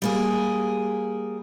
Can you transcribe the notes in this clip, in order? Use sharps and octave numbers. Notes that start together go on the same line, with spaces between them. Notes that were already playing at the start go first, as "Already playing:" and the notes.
G3 A#3 G#4